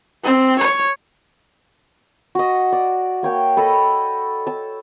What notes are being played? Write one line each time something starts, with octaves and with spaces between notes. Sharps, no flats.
C4
C#5
F#4 D#5
D5
A#3 C#5 G5
A4 D#5 B5
A5 E6